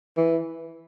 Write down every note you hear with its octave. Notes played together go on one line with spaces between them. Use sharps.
E3